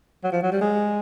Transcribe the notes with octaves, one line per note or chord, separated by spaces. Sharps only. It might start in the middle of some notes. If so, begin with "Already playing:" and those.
F#3
F3
F#3
G3
G#3